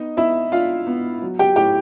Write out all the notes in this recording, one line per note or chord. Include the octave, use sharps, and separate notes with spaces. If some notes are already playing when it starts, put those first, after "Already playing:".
Already playing: B3 D#4 D#5
B3 E4 E5
D4 F4 F5
B3
F#3
G4 G5
A2 G4 G5